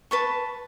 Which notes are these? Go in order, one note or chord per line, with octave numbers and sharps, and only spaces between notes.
B4 A5 C#6